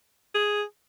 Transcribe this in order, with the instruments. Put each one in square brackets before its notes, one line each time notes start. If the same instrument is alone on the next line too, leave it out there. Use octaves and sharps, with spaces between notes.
[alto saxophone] G#4